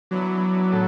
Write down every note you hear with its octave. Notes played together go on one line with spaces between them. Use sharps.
E3 F#3 B3 D4
A2 B3 F#4 A4